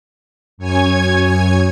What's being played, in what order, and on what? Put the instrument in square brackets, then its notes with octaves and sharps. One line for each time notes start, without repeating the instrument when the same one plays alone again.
[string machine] F#2 C#5 G#5 G#6